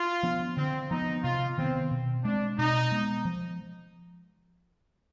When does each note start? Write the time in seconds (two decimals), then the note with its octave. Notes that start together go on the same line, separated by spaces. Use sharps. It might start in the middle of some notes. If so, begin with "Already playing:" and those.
Already playing: F4
0.23 F3 B3 D4
0.57 D3 C4
0.90 F3 B3 D#4
1.23 C3 F4
1.58 D#3 B3 C4
1.91 B2
2.24 G#3 C4 D4
2.58 B2 D#4
2.92 G#3 B3
3.25 F3